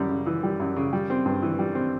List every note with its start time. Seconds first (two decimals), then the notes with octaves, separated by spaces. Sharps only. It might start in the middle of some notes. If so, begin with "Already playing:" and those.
Already playing: F#2 E3 G3
0.10 C#3
0.26 E3
0.43 G3
0.60 F#2
0.76 C#3
0.93 G3
1.10 C4
1.26 G2
1.42 E3
1.59 G3
1.75 C4